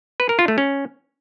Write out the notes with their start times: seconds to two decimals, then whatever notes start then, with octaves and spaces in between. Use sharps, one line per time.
0.20 B4
0.29 A#4
0.39 F4
0.48 A3
0.58 C#4